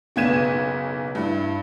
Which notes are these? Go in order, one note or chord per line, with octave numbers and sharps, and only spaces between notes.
F#1 B1 B3 G#6 D#7 E7
G2 E4